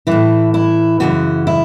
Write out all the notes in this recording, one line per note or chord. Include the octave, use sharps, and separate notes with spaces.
A2 E3 E4
E4
F#2 C#3 E3 F#4
E4